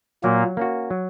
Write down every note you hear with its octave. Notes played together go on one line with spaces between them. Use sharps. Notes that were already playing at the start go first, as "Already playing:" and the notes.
A#2 F#3 A#3
A#3 C#4 F#4
F#3